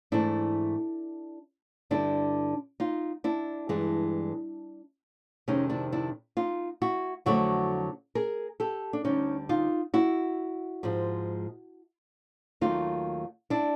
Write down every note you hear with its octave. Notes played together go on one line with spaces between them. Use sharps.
G#2 E3 A3 D4 E4
G2 D3 G3 D4 E4
D#4 F4
D4 E4
G2 E3 G#3
F2 C3 D#3 G#3 C#4 D#4
D4 E4
D4 E4
D#4 F4
E4 F#4
F2 D3 F#3 A3 E4 F#4
G#4 A#4
G4 A4
D4
D2 D3 G3 C#4 D#4
D#4 F4
E4 F#4
G#2 F3 G#3
D#2 D#3 F#3 A3 D#4 F4
D4 E4